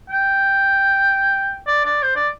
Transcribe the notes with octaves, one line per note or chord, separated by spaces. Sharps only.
G5
D5
D5
C5
D5